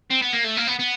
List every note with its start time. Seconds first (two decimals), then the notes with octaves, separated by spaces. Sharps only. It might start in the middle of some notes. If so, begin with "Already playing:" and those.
0.11 C4
0.22 B3
0.33 A#3
0.44 A3
0.57 A#3
0.67 B3
0.79 B3